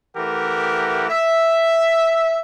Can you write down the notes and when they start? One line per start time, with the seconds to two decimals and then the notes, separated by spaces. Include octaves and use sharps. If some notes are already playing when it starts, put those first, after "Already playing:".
0.17 E3 A3 G4 A#4 F#5
1.10 E5